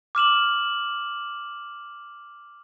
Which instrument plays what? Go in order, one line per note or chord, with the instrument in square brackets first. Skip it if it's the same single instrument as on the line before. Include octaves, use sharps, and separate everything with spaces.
[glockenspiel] D6 F6 E7 F#7